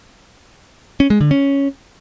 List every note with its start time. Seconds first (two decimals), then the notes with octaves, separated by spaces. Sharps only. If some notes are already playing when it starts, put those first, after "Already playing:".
1.00 C#4
1.10 G#3
1.21 D3
1.31 C#4